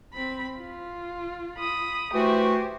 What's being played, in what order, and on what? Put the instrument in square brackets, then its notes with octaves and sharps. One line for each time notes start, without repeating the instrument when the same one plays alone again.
[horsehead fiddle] C4 B5
F4
[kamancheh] B5 D#6
[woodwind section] E3 A3 F#4 [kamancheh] G4 [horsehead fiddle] C5 G#5